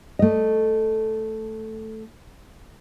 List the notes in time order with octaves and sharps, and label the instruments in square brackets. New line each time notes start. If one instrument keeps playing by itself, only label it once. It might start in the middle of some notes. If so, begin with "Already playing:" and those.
[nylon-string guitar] A3 D#5